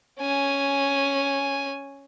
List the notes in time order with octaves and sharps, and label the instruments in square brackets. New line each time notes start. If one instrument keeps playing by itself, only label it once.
[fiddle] C#4 G#5